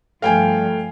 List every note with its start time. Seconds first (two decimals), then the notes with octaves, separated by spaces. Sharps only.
0.22 G2 F3 A3 F5 G5 G#5